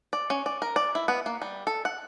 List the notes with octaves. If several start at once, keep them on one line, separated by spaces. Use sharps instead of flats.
D5
C#4
D5
A#4
D5
E4
B3
A#3
G3
A4
F#5